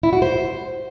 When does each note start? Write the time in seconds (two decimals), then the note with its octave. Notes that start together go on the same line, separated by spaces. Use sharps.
0.03 E4
0.13 F#4
0.22 C5